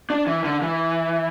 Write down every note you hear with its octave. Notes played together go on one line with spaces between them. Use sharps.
D4
E3
D3
E3